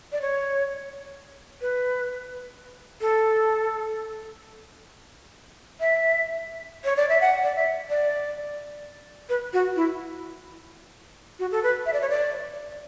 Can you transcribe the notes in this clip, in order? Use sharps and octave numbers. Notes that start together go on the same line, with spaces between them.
D5
C#5
B4
A4
E5
C#5
D5
E5
F#5
D5
E5
D5
B4
F#4
E4
F#4
A4
B4
E5
D5
C#5
D5